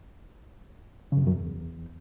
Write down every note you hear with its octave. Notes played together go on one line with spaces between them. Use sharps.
C#3
F#2
C3
F#2
E2